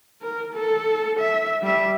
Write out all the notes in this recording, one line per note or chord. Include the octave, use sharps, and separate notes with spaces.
A#4
A4
E5
G3 E5